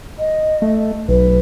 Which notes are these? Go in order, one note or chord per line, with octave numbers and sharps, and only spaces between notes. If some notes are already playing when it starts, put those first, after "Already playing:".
D#5
A3
B1 B4